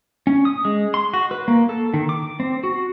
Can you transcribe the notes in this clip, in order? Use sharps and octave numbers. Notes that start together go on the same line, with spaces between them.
C#4
D#6
G#3
C6
F#4
B4
A#3
A4
D#3
D6
C4
F#4